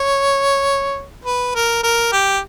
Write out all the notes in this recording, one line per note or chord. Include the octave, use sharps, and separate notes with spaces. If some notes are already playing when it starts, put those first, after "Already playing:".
Already playing: C#5
B4
A#4
A#4
G4